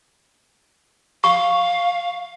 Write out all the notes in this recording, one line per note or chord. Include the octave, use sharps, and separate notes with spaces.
F5 C#6